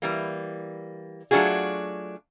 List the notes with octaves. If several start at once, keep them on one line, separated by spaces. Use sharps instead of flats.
E3 G3 A#3
F#3 A3 D4 F4 F#4 G#4